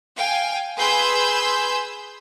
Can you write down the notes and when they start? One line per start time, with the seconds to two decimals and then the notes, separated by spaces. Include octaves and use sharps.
0.16 F5 G5 G#5
0.77 G#4 B4 G#5 C6 E6 G6